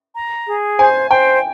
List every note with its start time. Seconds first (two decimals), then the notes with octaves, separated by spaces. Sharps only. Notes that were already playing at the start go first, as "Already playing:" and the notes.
0.15 A#5
0.47 G#4
0.79 C5 G#5
1.11 C5 G5